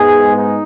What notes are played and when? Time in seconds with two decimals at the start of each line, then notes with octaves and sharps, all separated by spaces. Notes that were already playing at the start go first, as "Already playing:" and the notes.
Already playing: G#2 G#3 B3 G#4
0.34 D#4